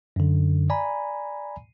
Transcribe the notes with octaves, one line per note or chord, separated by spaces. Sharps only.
F#2 D3
D5 G#5 A#5 B5